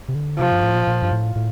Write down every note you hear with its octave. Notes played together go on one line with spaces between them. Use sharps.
C3
D3
C3 F3
G2
A2
A#2
A#2
G2
A2
A2